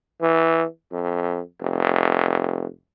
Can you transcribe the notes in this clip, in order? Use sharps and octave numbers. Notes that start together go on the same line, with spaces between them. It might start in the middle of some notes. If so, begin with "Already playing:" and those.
E3
F2
F1